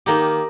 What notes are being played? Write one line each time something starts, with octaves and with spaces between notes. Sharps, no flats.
D#3 A#3 D#4 G4